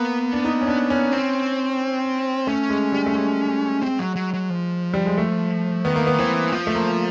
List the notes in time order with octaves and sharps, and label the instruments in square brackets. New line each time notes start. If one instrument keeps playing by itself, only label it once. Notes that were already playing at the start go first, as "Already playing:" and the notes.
Already playing: [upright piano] A#3 [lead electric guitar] B3
[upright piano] D4
D#4
C#4
D4
C#4
[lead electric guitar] C4
[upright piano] A3 [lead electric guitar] C#4
[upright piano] G#3
G3
A3
G#3
[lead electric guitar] C4
F#3
F#3
F#3
F3
[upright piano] G3
G#3
A3
[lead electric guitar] D#3 [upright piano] B3
[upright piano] A#3
B3
[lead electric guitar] E3 [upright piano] C4
[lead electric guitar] F3
[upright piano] A3
A#3